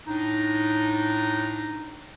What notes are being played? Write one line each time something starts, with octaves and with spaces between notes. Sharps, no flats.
A2 D4 D#4